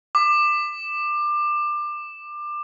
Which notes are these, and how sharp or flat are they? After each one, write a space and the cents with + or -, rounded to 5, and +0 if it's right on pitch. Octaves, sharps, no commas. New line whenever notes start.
D6 +25